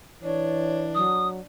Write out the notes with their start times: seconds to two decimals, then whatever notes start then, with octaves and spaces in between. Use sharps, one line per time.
0.23 E3 D4 C#5
0.95 F#3 D#6